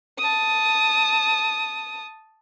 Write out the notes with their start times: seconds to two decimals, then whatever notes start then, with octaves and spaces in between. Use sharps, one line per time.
0.19 A5 D#6